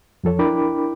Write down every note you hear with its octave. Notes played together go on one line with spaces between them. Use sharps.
F2 F3 A4 C#5
D4 E4 A#4 G5 B5 D6